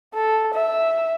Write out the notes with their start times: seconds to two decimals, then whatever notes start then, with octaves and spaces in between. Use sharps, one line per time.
0.15 A4
0.54 E5